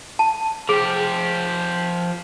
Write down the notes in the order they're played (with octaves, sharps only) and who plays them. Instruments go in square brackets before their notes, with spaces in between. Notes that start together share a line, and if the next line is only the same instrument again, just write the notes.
[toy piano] A5
[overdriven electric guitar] F3 G4 [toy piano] G#4